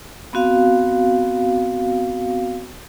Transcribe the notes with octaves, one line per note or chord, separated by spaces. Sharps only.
B3 C4 F#4 F5